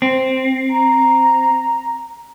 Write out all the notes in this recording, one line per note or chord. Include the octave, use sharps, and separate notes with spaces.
C4
A#5